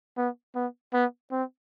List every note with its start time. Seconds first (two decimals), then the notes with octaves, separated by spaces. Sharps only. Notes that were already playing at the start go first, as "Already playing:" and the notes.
0.17 B3
0.55 B3
0.93 B3
1.31 C4